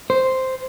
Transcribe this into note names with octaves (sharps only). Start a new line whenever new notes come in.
C5